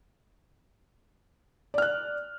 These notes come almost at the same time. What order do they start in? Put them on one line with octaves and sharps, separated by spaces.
D5 F6 F#6